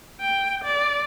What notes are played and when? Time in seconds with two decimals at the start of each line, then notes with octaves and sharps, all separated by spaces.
0.20 G5
0.64 D5